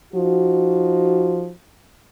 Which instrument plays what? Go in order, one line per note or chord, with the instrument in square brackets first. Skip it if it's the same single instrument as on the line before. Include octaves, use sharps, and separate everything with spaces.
[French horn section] F3 D#4 F#4